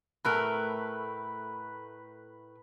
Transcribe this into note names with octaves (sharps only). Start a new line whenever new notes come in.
A2 A3 A#4 B4